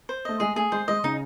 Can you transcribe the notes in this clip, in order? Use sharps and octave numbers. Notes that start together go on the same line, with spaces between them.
C5
A3 D#5
G#3 G#4
A3 G#4
G#3 C5
G#3 D#5
C#3 D#4